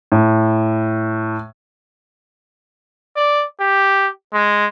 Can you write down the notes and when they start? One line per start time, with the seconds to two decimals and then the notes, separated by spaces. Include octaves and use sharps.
0.12 A2
3.16 D5
3.60 G4
4.34 G#3